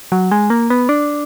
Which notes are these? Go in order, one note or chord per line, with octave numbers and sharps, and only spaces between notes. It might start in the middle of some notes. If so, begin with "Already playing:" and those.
F#3
G#3
A#3
B3
D4